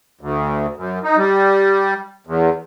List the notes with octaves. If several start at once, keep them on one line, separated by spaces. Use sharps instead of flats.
D2
F#2
D#4
G3
E2